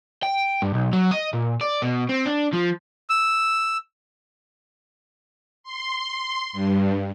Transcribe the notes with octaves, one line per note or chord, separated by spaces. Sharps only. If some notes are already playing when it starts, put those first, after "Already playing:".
G5
G2
B1
F#3
D#5
A#2
D5
B2
C4
D4
F3
E6
C6
G2